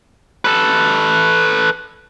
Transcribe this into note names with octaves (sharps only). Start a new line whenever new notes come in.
A4 B4